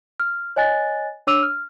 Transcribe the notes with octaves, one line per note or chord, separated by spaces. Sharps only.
F6
C#5 D#5 G#5 F#6 A6
D4 C#5 D6 E6 D#7 F7
F6